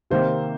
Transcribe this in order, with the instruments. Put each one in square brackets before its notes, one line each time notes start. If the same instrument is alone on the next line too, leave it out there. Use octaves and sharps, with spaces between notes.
[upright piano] C3 D#3 A#3 C5